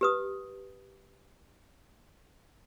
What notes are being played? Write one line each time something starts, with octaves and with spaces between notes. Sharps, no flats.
G4 B4 D#6